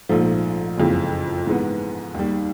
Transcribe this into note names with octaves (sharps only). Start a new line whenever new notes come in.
A#1 G#2 F3 A3
F#1 F2 C#3 E3 G#3
G#2 E3 G#3 B3
D#2 D#3 G3